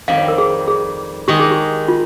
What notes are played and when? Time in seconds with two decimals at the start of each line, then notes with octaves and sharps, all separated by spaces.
0.08 F2 D#3 G3 F5
0.18 C#5
0.28 A#4
0.38 G#4
0.68 G#4
1.28 D#3 G#3 D#4 G4
1.40 G#4
1.51 G4
1.88 F4